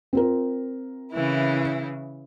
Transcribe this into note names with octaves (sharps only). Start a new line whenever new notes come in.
C4 F4 A#4
C#3 E3 E4